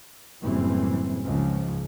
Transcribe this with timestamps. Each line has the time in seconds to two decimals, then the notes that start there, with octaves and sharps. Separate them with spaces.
0.41 F#1 A2 E3 G3 C4
1.22 C#2 G#2 F3 G#3